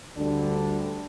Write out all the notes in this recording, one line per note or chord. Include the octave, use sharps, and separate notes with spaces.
D2 D3 G3 D4